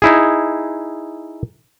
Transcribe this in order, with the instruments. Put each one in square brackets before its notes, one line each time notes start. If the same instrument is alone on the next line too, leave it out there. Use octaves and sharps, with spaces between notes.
[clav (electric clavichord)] D#4 E4 G#4